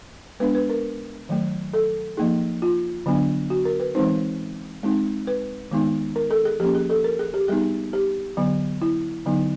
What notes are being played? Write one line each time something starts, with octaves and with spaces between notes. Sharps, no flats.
G#3 B3 D4 B4
B4
A#4
D#3 F#3 A3
A4
F3 A#3 D#4 G#4
F4
D3 F#3 B3 D4
F#4
A#4
B4
E3 G#3 C4 D#4 C5
G#3 C4 D#4
B4
D#3 G#3 B3 D#4
A#4
A4
G#4
F3 A#3 C#4 G4
G#4
A4
A#4
G#4
G4
G3 B3 D#4 G#4
G4
D3 F#3 B3
E4
D3 F#3 B3 D#4